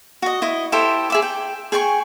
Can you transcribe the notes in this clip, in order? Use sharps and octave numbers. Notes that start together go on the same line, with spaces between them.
F#4 D#5
E4 D#5
E4 G4 A4 C5
G#4 E5 D6
G5
G#4 G5 G#5 C#6